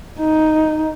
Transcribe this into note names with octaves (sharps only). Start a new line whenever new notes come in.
D#4